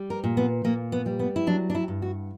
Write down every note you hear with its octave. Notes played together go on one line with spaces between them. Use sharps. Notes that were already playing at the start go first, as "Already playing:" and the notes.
Already playing: G3
A#4
A#2
B3
A#2 A#3
B3
G3
B3
E4
F#3 D4
D4
E4
G2
F#4